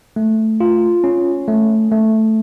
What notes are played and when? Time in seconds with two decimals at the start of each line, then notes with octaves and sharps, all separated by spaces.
0.16 A3
0.60 F4
1.04 C#4
1.48 A3
1.91 A3